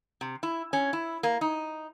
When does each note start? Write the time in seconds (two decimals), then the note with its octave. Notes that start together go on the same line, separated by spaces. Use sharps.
0.21 C3
0.43 E4
0.73 C#4
0.93 E4
1.23 A#3
1.41 D#4